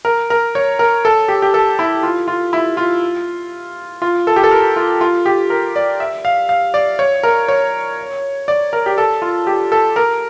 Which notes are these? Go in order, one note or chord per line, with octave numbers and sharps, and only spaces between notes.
A#4
A#4
C#5
A#4
A4
G4
G4
A4
E4
F4
F4
E4
F4
F4
A4
G4
A4
A#4
F4
F4
G4
A#4
D5
E5
F5
F5
D5
C#5
A#4
C#5
D5
A#4
G4
A4
F4
G4
A4
A#4